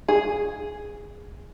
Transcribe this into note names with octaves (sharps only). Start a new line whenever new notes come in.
G#4